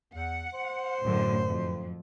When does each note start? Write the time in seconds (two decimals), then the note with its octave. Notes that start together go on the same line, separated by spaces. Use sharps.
0.15 E2 F#5
0.54 C5
1.03 F#2 A2 D3
1.46 F2